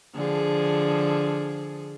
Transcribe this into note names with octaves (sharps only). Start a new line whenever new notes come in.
D3 F3 G#4